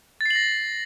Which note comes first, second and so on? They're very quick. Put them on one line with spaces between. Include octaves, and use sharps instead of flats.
A6 C7 F#7 A#6